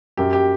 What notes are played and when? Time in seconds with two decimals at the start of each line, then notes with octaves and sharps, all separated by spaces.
0.17 F#2 G4
0.33 G4